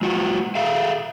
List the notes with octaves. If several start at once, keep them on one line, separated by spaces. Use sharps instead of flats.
G#3 F4 F#4
G#4 A4 E5 F5